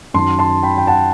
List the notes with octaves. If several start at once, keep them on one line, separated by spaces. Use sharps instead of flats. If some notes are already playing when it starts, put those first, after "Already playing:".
F#2 D#3 F#3 A5 C6
A5 C6
G5 B5
G5
F#5 A5